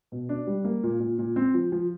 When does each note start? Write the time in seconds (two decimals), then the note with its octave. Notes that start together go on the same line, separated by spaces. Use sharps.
0.12 B2
0.29 D4
0.47 G3
0.64 A#3
0.83 A#2
1.00 A#2
1.19 A#2
1.36 C4
1.54 F3
1.72 F3